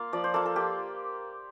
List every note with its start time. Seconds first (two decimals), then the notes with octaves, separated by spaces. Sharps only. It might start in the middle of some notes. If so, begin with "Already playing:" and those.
Already playing: A#3 F4 F5
0.13 F3 D5
0.24 C5
0.34 A#3 F4 A4
0.45 A4
0.56 A#3 G4